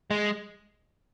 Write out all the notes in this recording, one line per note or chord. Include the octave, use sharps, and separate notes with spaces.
G#3